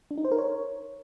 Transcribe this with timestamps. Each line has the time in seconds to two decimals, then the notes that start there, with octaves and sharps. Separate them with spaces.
0.11 D4
0.18 D#4
0.25 C5
0.32 A#4
0.38 C#5